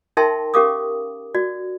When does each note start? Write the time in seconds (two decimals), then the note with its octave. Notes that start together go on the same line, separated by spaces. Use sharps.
0.17 D#4 A#4 E5 G5 A5 C6
0.54 C#4 G4 A#4 F5 D6 D#6
1.34 F#4 D5